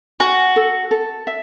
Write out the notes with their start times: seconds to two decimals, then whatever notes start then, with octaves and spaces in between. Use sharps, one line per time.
0.20 F#4 G#5
0.56 A4
0.91 A4
1.27 E5